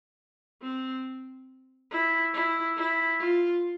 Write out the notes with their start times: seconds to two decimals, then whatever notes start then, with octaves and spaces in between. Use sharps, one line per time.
0.62 C4
1.91 E4
2.33 E4
2.77 E4
3.19 F4